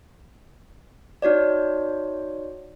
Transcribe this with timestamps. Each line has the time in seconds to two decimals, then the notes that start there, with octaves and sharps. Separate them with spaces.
1.22 D#4 F#4 C#5 D5